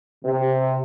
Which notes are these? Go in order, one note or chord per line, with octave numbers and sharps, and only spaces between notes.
C3